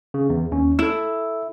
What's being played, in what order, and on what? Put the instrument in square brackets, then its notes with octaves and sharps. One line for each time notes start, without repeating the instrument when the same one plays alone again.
[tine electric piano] C#3
E2
D#2 C#4
[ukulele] E4 [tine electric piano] A4 E6